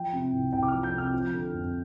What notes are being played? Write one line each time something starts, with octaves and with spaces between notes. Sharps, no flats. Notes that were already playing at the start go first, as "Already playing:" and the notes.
Already playing: F3 G5
C3
C2
C2 G5
D6
F3 F6
G6
C3
F6
F3
D3
F2